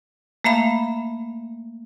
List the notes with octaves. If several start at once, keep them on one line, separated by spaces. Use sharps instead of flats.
A3 A#3 E5 F5 B5